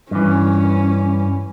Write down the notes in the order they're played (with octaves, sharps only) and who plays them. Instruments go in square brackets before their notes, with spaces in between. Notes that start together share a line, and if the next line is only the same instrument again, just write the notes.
[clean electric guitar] G2 E3 [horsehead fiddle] C#4